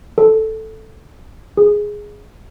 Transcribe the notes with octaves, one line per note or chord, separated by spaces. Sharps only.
A4
G#4